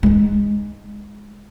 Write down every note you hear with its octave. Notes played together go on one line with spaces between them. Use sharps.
G#3 D#4